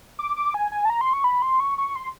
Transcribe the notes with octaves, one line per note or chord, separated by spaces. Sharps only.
D6
D6
G#5
G#5
A5
A#5
C6
C#6
B5
C6
C#6
C#6
C6